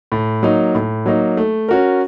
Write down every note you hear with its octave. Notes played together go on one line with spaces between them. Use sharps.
A2
F#3 A#3 D#4
A2
F#3 A#3 D#4
A3
C#4 F#4 A#4